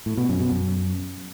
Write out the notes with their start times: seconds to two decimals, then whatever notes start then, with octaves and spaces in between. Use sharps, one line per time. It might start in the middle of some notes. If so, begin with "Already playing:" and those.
0.06 A2
0.17 B2
0.29 F#2
0.40 B2
0.51 F#2